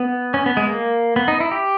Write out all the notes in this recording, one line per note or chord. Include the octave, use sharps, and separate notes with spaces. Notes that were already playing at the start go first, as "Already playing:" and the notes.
Already playing: B3
C#4
B3
G#3
A#3
B3
D#4
E4
G4